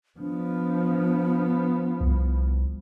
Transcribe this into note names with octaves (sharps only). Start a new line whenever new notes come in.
F3 B3 D4
C2